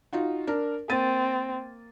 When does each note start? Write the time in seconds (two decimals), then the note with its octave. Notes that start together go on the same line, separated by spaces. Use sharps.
0.13 D#4 F4 F#4
0.47 D4 A#4
0.90 A#3 C4 A6 D#7